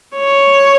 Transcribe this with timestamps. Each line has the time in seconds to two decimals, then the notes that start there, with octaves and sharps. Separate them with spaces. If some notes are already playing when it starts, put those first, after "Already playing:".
0.17 C#5